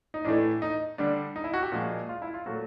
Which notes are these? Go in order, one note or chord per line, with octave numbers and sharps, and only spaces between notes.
D#4
A2 E3 A3 D4
D#4
D3 G3 D4
D#4
E4
F#4
G4
A#2 F3 G#3 F#4
F4
E4
F4
A#2 F#3 A3 F#4